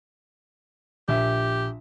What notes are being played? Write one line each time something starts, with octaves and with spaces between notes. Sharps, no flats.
A#1 G4 E5